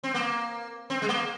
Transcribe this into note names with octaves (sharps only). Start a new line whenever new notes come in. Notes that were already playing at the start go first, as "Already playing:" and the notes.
C4
A#3
C4
G#3
A#3